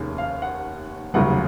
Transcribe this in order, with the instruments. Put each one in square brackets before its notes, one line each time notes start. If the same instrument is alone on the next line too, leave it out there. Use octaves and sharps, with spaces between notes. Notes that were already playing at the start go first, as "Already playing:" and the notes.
Already playing: [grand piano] F1 D#2 D#3 G#3 C#4
F5
F#5
F1 D#2 C#3 F#3 F#5